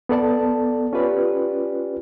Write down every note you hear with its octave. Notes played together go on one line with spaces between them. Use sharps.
B3 A4 D5 A5
C#4 F4 G4 B4 D5